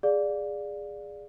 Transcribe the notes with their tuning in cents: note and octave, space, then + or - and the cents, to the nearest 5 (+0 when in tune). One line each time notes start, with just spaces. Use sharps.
G#4 -15 D5 +0 F5 +30